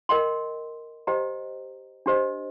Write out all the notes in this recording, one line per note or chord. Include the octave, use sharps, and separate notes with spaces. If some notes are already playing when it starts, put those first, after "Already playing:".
A#4 D#5 G5 C6
G4 C5 D#5 G5 A#5
D4 G4 C5 D#5